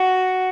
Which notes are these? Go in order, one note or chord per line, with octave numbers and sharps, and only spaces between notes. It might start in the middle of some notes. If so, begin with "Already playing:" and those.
Already playing: F#4